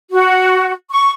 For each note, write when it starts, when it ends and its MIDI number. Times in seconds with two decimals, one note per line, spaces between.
0.12 0.73 66
0.91 1.11 85